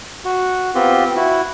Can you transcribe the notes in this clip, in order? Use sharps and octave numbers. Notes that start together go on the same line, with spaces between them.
F#4
B3 C4 F4 G4
E4 F#4